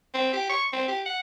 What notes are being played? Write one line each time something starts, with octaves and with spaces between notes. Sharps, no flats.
C4
G4
C#6
C4
G4
F#5